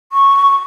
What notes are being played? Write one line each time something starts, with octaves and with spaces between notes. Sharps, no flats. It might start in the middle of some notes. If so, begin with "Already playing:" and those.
C#6